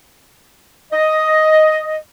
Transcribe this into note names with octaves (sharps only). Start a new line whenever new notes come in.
D#5